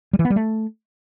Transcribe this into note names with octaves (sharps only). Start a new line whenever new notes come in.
G3
E3
B3
G3
A3